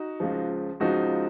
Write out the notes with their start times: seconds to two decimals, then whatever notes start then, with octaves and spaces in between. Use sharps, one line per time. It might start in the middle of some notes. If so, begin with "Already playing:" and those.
Already playing: D#4 F#4
0.20 C#2 C#3 F3
0.80 C#2 C#3 F3 D#4 F#4